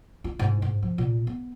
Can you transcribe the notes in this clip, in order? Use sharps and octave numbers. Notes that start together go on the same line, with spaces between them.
F4
G#2
G#2
F3
A#2
B3